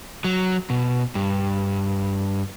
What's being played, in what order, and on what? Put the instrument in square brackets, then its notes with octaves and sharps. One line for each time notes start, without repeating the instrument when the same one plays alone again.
[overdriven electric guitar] F#3
B2
G2